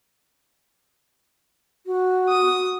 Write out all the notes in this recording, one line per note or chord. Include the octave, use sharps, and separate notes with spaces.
F#4
D#6